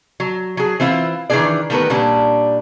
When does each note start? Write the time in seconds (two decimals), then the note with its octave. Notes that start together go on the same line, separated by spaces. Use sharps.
0.20 F#3
0.57 F#3 G#4
0.80 E3 C4 E4 F4
1.30 D#3 E3 A3 D4 G#4 D5
1.70 D#3 G3 A3 B3 A#4 B4
1.90 A#2 G3 C#4 D4